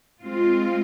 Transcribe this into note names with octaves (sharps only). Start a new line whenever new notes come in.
G#3 C4 F4